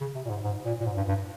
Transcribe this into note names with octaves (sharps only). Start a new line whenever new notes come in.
C#3
C3
A#2
G#2
G#2
A#2
A#2
G#2
G2
G2